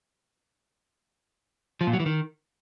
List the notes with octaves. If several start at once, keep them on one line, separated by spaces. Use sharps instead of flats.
F3
A#2
F#3
E3
D#3